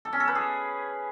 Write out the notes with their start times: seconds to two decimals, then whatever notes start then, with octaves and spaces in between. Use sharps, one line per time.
0.05 A4
0.13 C#4
0.20 A4
0.28 B4
0.35 G#4